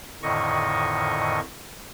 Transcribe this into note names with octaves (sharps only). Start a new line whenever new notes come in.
F2 A2 D3 D#3 D#5 C#6